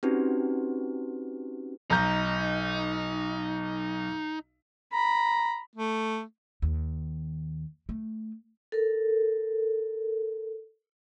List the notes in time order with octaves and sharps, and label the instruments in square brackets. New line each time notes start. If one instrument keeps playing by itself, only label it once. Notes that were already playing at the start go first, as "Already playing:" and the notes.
[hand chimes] C4 C#4 D#4 F#4 G4 B4
[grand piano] B1 A#5 G6 [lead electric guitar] D#4
[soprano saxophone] A#5 [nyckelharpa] B5
[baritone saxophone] A3
[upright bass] D#2
A3
[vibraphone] A4 A#4